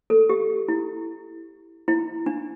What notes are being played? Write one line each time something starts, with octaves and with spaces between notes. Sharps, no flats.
A4
G4
E4
E4
D4